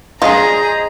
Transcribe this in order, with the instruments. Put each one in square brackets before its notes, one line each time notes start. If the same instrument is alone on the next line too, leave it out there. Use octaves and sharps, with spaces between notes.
[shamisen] D4 F4 [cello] G#4 [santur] C5 D#5 [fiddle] A#5